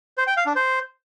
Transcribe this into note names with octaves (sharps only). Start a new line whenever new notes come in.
C5
G5
F5
D4
C5